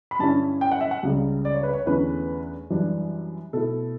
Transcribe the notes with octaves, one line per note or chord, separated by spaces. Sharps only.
B5
G2 D3 G3 C#4 E4 A5
G5
F#5
E5
F#5
C#2 C#3 G3
D5
C#5
B4
C#5
E2 D3 A3 C#4 E4 B4
F#2 E3 G3 D4
B2 A3 E4 A4